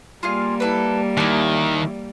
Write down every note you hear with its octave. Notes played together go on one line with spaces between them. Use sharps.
G3 A#3 F4 G#4 F5
E4 A4 B4
D#2 D#3 E4 D5